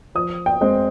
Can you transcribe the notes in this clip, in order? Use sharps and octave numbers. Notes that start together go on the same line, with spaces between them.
F3 D#6
G5
G#3 C4